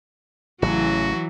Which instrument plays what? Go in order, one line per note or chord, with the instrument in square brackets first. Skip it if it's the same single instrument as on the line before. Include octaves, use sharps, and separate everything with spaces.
[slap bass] A1 C#3 [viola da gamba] E3 F#3 [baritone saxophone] F#4